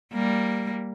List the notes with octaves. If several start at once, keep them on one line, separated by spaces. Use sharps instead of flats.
G3 A#3